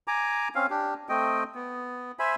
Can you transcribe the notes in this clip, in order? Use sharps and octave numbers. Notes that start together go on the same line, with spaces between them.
G#5 A#5 D6
C4 C#4 F5
D4 G4
A3 C4 D#5 G5
B3
C5 E5 G#5 B5